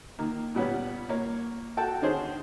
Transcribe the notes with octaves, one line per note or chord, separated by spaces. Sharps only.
D#3 A#3
A#2 G3 B3 C#4
A#3 C#5
F#4 A4 G5 A5
D3 D#3 C#4 G#4 C5